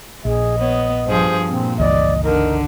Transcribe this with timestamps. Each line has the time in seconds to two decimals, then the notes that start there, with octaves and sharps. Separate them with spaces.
0.25 A#1 G#4 D#5
0.59 B3 C#5
1.06 G2 F3 G#4 C5
1.49 A#2 C4
1.79 G1 C#2 E3 D5 D#5
2.24 D3 D#4 A#4